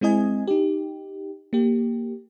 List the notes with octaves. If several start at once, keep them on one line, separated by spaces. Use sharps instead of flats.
G#3 C4 E4 D#5 G#5
D#4 G4
A#3 G4